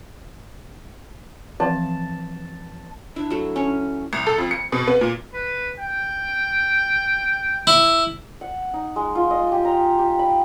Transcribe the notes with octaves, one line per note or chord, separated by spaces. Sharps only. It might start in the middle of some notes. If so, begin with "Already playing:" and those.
E3 F3 C4 A5
D4 E4
F#3 A3
C#4 C#5
C2
A4
F2
C#7
B2
B3
A#2
B4
G5
E4
F#5
D#4
G#3
F4
D#5
G4
A#5
G4
B5